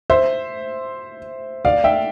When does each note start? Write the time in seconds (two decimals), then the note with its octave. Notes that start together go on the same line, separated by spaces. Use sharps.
0.10 C5 E5
1.65 D5 F5
1.84 E5 G5